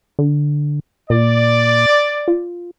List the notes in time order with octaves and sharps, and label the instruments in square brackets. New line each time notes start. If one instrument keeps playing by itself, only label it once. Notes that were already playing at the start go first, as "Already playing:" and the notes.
[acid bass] D3
[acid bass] A#2 [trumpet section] D5
[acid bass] F4